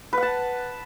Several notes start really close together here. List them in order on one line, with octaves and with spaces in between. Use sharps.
B4 F#5 A5